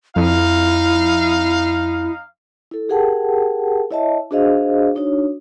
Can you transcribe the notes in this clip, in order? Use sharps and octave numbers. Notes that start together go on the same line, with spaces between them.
F2 D#4 E4 F5
E4 A4
G4 G#4 A#4 F#5 G5 A5
E4 C#5 D#5 E5 A5
D4 F#4 G#4 C5 D#5 F5
D4 D#4 F#4 C#5